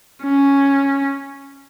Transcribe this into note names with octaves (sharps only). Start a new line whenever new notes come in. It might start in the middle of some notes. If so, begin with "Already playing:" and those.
C#4